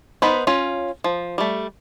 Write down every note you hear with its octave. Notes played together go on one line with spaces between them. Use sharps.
B3 D#4 B4 C5
C#4 F4
F3
G3 A3